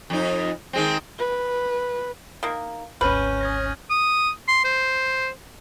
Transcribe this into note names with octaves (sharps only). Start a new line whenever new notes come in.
F2 D#4
D#3 G#3 C4
B4
D#3 A#3
G#1 D2 C#4 B4 F6 G6 D#7
D#6 G#6 A#6
D#6
C6
C5